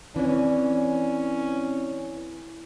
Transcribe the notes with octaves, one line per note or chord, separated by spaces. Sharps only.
E3 C4 C#4 D5